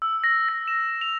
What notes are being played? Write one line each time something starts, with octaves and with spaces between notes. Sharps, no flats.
E6
A#6
A#6
E7
F7